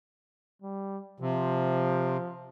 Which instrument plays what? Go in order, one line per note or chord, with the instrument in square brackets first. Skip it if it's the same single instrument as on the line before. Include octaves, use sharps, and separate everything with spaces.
[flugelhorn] G3
[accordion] C3 [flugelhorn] F3